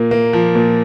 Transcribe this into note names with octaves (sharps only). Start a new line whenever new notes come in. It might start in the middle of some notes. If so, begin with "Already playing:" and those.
Already playing: A#2 A#3
A#3
F3
A#2